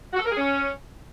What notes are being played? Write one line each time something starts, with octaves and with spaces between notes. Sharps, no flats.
F#4
A4
A#4
G#4
C#4